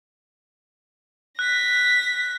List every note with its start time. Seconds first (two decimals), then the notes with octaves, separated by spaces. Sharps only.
1.39 F#6 A#6 B6